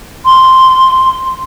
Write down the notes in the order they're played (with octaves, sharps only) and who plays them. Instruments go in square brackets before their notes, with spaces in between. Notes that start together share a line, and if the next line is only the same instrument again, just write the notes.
[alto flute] C6